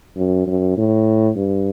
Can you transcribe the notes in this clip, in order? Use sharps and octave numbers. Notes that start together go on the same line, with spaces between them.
F#2
F#2
A2
G2